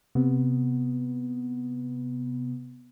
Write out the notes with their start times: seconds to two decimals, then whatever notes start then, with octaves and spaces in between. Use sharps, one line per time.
0.15 C3 B3